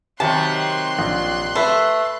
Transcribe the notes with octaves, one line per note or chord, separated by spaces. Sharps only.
C3 D#3 F#3 G4 A5 C6 F#6
A#1
A3 B4 E5